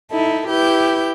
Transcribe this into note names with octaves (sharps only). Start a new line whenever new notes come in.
D#4 E4 A4
E4 G4 B4 G6